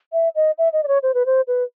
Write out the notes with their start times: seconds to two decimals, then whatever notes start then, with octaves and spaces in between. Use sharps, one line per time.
0.13 E5
0.36 D#5
0.58 E5
0.73 D#5
0.84 D5
0.88 C#5
1.03 C5
1.14 B4
1.26 C5
1.48 B4